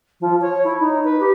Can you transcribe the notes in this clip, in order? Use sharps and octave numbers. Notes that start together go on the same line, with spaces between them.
F3
C#5
E4
D#4
B4
G4